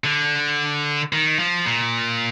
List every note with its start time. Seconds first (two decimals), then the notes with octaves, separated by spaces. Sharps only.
0.04 D3
1.13 D#3
1.39 F3
1.66 A#2